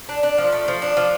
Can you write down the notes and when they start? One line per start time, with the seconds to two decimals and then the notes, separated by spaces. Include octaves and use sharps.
0.09 D4
0.23 D4
0.38 F3
0.52 A3
0.68 F3
0.82 D4
0.97 F3